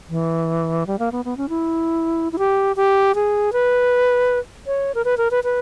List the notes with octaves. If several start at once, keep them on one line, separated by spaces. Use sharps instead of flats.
E3
G3
A#3
B3
B3
C#4
E4
E4
G4
G4
G#4
B4
C#5
A#4
B4
A#4
B4
B4